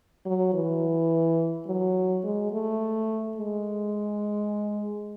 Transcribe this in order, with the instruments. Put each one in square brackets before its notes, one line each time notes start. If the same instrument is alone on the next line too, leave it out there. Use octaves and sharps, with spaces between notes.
[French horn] F#3
E3
F#3
G#3
A3
G#3